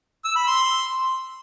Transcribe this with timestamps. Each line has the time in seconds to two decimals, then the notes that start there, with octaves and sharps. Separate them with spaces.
0.25 E6
0.36 B5
0.47 C6